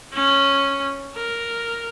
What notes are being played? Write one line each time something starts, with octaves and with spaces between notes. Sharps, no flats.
C#4
A#4